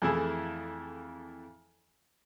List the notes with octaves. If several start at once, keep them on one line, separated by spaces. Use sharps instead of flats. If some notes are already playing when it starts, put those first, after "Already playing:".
F2 E3 A3 E4 G#4